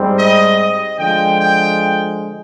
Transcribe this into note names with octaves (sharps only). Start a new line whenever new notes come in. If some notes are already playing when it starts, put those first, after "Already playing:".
Already playing: G#2 G3 C4
D#5
D#5
D3 F3 G#3 G5
G5